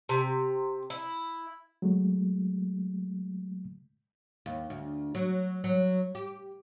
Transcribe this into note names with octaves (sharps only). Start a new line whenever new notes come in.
C3
E4
F#3 G#3 A3
D#2
D2
F#3
F#3
G4